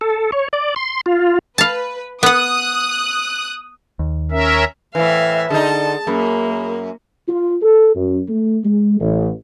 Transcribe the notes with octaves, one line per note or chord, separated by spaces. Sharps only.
A4
C#5
D5
C6
F4
B4 F5 A5
B3 F#5 D#6 F#6
D#2
C#4 A#4 E5
A2 E3 B4 C5 E5 F5
D3 D#4 G#4 A5
F#2 A#3 G#4 A#4 B5
F4
A4
F#2
A3
G#3
A1